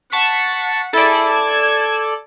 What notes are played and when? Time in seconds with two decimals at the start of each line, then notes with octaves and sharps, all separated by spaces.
0.12 F#5 A5 C#6 B6
0.93 E4 G#4 A4 D5
1.32 G#6 E7